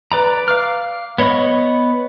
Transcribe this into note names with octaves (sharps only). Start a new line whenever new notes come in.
B4 D5 A#5
F5 D6 F6
B3 C#5 D#5 B5 C#6